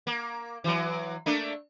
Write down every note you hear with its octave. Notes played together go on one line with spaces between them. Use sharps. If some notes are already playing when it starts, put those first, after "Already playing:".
A#3
E3 F#3
A3 A#3 D4